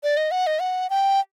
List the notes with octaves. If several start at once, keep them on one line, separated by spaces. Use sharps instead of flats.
D5
D#5
F#5
D#5
F#5
G5